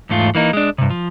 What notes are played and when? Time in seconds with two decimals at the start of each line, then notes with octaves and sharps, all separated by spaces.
0.09 E2 G#2 A3 F4
0.35 E3 A#3 D#4
0.53 G#3 D4
0.78 G2 C3
0.90 F3